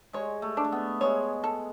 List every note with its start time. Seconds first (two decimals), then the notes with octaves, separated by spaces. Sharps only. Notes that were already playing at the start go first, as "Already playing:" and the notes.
0.13 G#3 C#5
0.42 A3
0.57 D4
0.64 A3
0.72 B3
1.01 G#3 C#5
1.44 A4